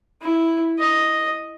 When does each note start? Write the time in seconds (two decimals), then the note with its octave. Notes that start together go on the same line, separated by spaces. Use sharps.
0.21 E4
0.78 D#5